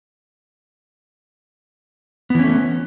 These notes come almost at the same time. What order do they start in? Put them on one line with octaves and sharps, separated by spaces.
B3 E3 C#4 A3